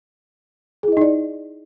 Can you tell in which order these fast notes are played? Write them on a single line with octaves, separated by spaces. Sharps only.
G#4 E4 D#5 D#4 D5